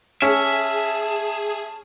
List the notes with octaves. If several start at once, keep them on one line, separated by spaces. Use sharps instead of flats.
C#4 G#4 E5 A5